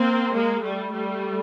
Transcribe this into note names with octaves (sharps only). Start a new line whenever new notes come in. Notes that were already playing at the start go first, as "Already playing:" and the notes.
Already playing: A#3 C4
G#3 A#3
G3 A3
G3 A3